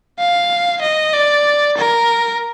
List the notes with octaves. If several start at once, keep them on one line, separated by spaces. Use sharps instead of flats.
F5
D#5
D5
A#4